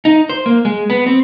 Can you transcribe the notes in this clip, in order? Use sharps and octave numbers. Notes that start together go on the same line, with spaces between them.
D#4
C5
A#3
G#3
B3
C4